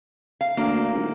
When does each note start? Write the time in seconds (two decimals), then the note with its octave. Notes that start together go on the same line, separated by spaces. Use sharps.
0.41 F5
0.57 D2 A#3
0.93 D#1